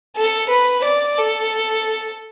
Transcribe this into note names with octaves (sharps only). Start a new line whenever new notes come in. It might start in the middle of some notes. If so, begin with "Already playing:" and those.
A4
B4
D5
A4